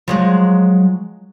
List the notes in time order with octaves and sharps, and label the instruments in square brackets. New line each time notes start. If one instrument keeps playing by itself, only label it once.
[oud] F3 F#3 G#3